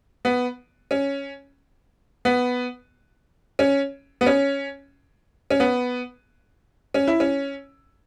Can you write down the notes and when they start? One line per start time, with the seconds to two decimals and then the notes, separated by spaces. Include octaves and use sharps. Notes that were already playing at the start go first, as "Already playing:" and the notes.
0.25 B3
0.91 C#4
2.25 B3
3.59 C#4
4.21 B3
4.26 C#4
5.50 C#4
5.60 B3
6.94 C#4
7.08 E4
7.20 C#4